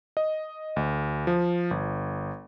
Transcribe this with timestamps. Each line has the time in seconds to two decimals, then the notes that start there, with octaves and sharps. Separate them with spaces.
0.17 D#5
0.76 D2
1.27 F3
1.71 G1